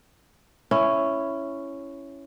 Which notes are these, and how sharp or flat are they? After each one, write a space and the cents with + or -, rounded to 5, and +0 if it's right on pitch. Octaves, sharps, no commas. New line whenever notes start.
C#4 +0 E4 +10